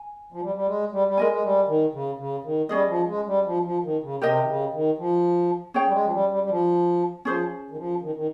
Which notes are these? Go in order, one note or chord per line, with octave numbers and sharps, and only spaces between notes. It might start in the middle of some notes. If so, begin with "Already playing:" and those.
Already playing: G#5
F3
G3
G3
G#3
G3
G3
G#3 A#4 D#5 G#5
G#3
G3
D#3
C#3
C#3
D#3
G3 C#4 G#4 D#5
F3
G#3
G3
F3
F3
D#3
C#3
C3 G4 A#4 D#5 G5
D#3
C#3
D#3
F3
C#4 G#4 C#5 G5
G3
G#3
F3
G3
G3
G3
F3
F3 C#4 G#4 C5
D#3
F3
D#3
D#3